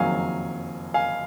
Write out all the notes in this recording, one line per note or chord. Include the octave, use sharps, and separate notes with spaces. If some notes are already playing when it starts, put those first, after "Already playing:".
Already playing: F#1 F2 D#3 F#3 F5 G#5
F5 G#5